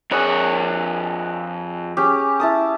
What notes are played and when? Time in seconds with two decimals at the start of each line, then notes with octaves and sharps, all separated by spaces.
0.11 F2 G#4 B4 C#5
1.97 C#4 G4 G#4
2.40 E4 A5 D#6